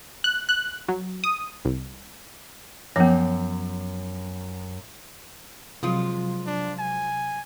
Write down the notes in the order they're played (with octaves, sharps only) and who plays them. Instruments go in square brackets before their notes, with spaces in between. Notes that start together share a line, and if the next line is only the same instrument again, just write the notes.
[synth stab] F#6
F#6
F#3
D#6
C2
[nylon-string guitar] F#2 [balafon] F3 B3
[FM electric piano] C3 F#3 [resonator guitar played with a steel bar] F3 G#3 F4
[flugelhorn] D4
G#5